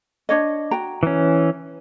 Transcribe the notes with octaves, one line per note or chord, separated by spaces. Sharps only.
D4 C#5 D#5
F#4 G5 A#5
E3 C#4